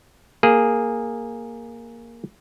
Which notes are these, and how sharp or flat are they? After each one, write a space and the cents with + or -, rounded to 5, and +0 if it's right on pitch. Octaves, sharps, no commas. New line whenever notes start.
A#3 +0 G#4 +0